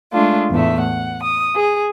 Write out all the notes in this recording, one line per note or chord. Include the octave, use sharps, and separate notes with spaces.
G#3 A3 D4 F4
E2 A2 A3 E5
F#5
D#6
G#4